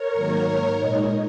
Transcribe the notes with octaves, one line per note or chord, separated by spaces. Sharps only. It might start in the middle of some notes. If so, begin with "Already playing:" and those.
Already playing: A#4 C#5
G#2 D#3 F#3 A#3
A#2 G#3 D#4